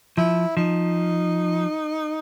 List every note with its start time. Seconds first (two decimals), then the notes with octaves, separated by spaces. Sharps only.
0.17 F3 E4
0.57 F3 D#4